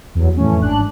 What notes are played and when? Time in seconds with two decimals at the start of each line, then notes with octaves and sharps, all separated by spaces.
0.15 E2 F#3
0.37 F2 A2 E3 A3 C#4
0.62 G#1 D4 F#6